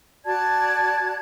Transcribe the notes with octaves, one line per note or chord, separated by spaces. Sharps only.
F#4 D5 A5 G#6